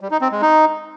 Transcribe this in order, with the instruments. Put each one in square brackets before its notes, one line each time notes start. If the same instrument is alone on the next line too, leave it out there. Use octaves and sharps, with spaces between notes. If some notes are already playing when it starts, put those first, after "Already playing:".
[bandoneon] G3
D#4
C4
G#3
D#4